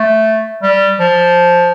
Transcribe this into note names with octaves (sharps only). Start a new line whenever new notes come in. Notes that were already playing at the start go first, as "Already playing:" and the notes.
Already playing: A3
G3
F3